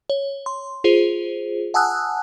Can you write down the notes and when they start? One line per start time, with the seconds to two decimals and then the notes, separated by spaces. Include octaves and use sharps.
0.10 C#5
0.46 C6
0.84 F4 G#4 C5
1.74 F#5 G#5 A5 D#6 E6 F#6